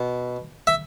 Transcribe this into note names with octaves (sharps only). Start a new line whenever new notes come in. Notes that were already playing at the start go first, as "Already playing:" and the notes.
Already playing: B2
E5